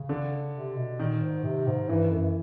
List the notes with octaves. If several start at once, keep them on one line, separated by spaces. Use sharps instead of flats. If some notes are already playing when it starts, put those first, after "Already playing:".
Already playing: C#3
D3
C3
B2
A#2 D#3
G#2
C3
G#2
G2 E3
F#2